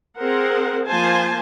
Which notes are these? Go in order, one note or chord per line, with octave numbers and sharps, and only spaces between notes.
C4 G#4 A#4 C5 F#5
F3 A#3 F4 C5 G#5 A5